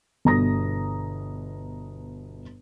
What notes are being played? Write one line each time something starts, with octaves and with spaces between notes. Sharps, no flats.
G1 B2 A#5 D#6 A#6